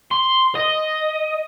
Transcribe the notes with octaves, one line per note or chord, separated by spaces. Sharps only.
C6
D#5